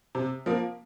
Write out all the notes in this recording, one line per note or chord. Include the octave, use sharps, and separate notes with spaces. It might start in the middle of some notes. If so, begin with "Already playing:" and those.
C3
F3 A#3